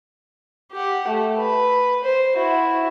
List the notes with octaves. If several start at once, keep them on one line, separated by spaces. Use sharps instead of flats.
G4 F#5
A3
B4
C5
E4 F#4